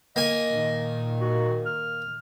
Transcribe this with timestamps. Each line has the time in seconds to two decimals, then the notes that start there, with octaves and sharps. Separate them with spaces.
0.16 A#3 D#5 G#5
0.47 A#2 D#3
1.21 F#4
1.66 F6